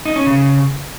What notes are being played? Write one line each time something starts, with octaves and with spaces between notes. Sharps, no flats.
D#4
C#4
C#3